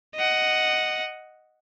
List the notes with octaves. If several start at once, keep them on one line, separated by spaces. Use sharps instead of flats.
D#5 F#5